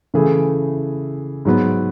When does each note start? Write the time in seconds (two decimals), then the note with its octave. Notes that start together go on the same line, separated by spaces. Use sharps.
0.14 C#3 E3 A3 E4 G#4
1.45 G#2 F#3 B3